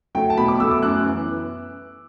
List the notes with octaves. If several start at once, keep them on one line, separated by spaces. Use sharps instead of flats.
F#3 A3 G5
A5
B2 B5
D6
F#3 A3 E6
D6
F#2 F#6
E3 B3